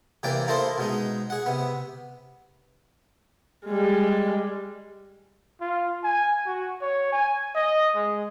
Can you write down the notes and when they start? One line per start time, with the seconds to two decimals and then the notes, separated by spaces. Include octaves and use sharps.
0.23 C3 E3 A#3 D5 G5 G#5
0.48 A#3 E4 A4 C5 D#5
0.78 B2 G#3 D#4
1.30 G#4 F#5
1.46 C3 B3
3.66 G3 G#3
5.61 F4
6.04 G#5
6.47 F#4
6.82 C#5
7.12 G#5
7.55 D#5
7.95 G#3